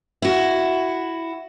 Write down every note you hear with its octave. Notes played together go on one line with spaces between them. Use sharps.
E4 F#4